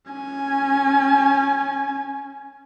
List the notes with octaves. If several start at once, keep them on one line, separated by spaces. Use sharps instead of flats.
C#4 G#5